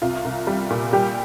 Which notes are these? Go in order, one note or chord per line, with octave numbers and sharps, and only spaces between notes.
C2 F4
C2
G3
A#2
G3 G4